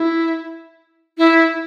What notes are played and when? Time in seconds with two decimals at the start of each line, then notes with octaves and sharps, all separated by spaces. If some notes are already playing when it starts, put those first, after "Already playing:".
Already playing: E4
1.18 E4